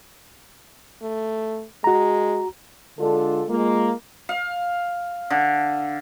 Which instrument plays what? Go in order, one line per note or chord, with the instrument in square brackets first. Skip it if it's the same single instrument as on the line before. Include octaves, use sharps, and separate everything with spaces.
[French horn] A3
[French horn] G#3 [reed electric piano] F#4 A#5
[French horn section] D3 G#3 D4 F4 A4
G#3 A#3 F4
[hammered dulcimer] F5
D3